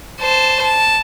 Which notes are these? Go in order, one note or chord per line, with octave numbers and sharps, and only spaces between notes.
C5 A5
A5